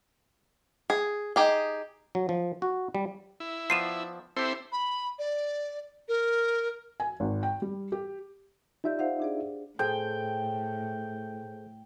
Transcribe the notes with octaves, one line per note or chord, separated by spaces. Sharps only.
G#4
D#4 G4 G#4
F#3
F3
F#4
G3
E4
F3 B3 D5 C7 D#7 E7
C4 E4 G4 A4 C5
B5
D5
A#4
G#5
G#1
G5
G3
G4
D#4 F4 G4 D5 E5 G6
C5 F5 F#5
D4 G#4 D5
A2 G#4 A4 C5 G5